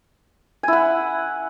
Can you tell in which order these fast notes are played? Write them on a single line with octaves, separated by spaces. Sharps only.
G#5 E4 F#5